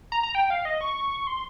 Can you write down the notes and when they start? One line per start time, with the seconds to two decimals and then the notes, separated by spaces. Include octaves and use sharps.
0.12 A#5
0.23 A#5
0.35 G5
0.50 F5
0.65 D#5
0.81 C#6
1.27 C6